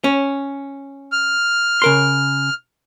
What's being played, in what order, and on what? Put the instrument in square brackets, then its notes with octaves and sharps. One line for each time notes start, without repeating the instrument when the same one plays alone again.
[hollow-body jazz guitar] C#4
[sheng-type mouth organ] F6
[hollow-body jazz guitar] C#3 A#4 C6